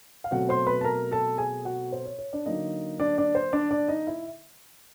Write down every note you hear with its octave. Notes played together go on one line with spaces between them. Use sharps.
F5
B2 F#3 A3 C4 F#4 F#5
C5 C6
B4 B5
A5
A#4 A#5
A4 A5
G#4 G#5
F#4 F#5
C5
C#5
C#5
D4 D5
D3 F#3 A#3 D#4 D#5
D4 D5
D4 D5
C5
D4 D5
D4 D5
D#4 D#5
E4 E5